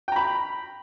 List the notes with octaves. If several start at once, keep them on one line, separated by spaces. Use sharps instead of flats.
G5 A#5 B5